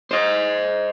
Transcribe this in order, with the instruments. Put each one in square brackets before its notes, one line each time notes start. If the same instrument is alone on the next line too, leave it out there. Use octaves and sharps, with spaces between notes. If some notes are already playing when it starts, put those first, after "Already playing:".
[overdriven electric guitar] C5 D#5